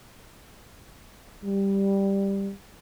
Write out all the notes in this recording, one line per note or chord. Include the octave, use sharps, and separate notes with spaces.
G3